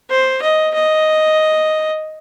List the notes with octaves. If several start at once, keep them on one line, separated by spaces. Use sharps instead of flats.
C5
D#5
D#5